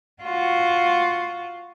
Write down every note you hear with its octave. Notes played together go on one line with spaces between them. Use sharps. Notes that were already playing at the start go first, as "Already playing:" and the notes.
F4 F#4